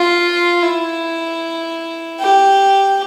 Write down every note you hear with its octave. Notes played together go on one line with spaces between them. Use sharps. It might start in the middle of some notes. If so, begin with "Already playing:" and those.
Already playing: F4
E4
G4